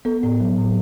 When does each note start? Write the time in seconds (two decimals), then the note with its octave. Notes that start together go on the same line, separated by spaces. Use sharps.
0.05 B3 A4
0.23 A2
0.40 F#3
0.57 A2